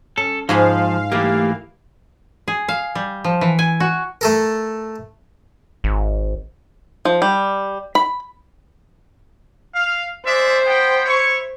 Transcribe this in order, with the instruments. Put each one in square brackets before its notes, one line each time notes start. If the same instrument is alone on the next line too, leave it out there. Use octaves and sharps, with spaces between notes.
[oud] C#4 [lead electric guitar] A4
[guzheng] G#2 G#4 B5 [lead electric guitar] F3 [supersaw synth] F5
[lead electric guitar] E3 A#3 [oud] A3 G4
[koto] G#4
F5
G3
F3
E3
G#5
F#4
[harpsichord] A3 A4 A#4
[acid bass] G#1
[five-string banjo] F3
G3
B5
[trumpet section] F5
[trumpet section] G#3 D5 E5 [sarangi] C5
[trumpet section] B3 G5
E4 C#5 C#6